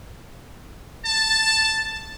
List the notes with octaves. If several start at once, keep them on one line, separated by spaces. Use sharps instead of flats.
A5